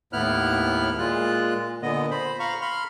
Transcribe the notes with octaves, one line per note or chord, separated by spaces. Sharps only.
D#2 A2 B3 E4 F6 F#6
A#2 G#3 F4 F#6
A#2 D3 B3 D#5
C5 B5
F5 A#5 B5 C#6
B5 C6 F6